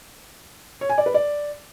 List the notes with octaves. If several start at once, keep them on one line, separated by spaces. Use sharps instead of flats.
C#5
G#5
D5
B4
D5